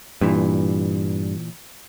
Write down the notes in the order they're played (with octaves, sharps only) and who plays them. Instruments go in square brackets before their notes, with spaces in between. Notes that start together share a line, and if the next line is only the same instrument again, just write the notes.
[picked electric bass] G2 [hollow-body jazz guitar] A#2 E3